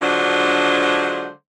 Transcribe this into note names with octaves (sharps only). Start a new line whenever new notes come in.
D3 F#3 G#3 D4 F4 C5